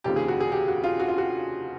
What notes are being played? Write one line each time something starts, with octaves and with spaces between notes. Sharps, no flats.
F1 D#2 C#3 F3 G4
G#4
F#4
G#4
G4
F#4
F4
F#4
F4
F#4